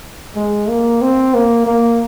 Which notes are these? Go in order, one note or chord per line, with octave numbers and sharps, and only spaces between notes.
G#3
A#3
C4
A#3
A#3